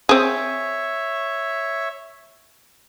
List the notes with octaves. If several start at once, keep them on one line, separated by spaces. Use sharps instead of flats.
C4 G#4 C#5 E5